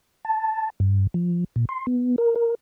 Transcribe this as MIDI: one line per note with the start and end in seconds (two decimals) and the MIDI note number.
0.25 0.70 81
0.80 1.07 43
1.14 1.44 53
1.56 1.65 46
1.69 1.86 84
1.87 2.16 59
2.18 2.36 70
2.36 2.55 70